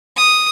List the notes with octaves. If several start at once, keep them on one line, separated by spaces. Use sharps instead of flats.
D#6